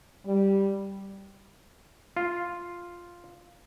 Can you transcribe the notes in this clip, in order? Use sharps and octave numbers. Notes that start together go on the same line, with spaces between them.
G3
F4